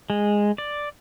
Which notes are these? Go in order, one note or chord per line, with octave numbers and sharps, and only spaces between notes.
G#3
D5